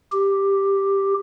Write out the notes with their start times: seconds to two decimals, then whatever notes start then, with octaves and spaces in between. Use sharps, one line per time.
0.12 G4